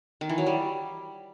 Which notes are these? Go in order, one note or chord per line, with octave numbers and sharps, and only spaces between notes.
D#3
E3
F#3
G3